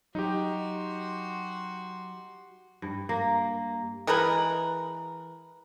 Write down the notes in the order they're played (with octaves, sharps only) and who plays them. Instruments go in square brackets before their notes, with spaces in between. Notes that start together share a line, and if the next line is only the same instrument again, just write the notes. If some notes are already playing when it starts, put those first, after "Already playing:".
[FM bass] F#3 [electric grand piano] D#4 G4 [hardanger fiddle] F#4 C6
[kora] G2
A#3
[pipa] E3 G#3 A#4 B4